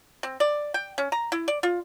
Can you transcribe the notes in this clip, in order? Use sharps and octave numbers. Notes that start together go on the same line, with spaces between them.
C4
D5
G5
C#4
A#5
E4
D5
F4